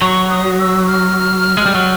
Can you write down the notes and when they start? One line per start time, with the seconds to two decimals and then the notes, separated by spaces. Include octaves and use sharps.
0.01 F#3 C#6
0.30 D#6
0.59 E6
0.87 F6
1.57 G#3
1.66 G3
1.75 F#3